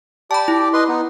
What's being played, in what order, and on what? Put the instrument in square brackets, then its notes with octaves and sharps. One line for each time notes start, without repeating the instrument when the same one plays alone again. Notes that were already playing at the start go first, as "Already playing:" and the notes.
[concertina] G4 D5 [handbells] A5 B5
[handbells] E4
[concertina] B4 D#5 C6
B3 D#4